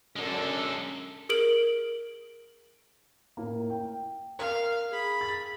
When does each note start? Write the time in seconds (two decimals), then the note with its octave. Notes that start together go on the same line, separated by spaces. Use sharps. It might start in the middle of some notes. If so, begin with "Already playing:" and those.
0.16 F#2 D3 G#3 A4
1.29 G#4 A#4 D7 F#7
3.37 A2 A#3
3.70 G5
4.39 A#4 F5
4.90 G#4 B5
5.21 A6